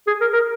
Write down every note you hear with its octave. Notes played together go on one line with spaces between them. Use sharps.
G#4
A#4
A#4